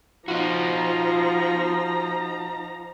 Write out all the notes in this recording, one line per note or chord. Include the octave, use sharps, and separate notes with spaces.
F3 D#4 F4 F#4 A#5